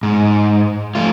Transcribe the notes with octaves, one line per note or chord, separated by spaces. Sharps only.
G#2
F3 A3 F4